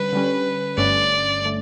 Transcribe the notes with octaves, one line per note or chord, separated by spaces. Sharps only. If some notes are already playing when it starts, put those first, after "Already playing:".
Already playing: D3 G3 C#4 B4
D3 G3 C#4
G1 G2 D3 A3 C#4 D5
D3 A3